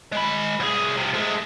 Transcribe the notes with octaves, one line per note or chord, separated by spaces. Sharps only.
G#3 B5
C2 G#4
C3 F3
G#3 A3